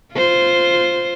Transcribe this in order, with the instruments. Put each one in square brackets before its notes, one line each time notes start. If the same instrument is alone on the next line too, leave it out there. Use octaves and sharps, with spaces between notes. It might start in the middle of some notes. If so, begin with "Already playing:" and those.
[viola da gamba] F4 C5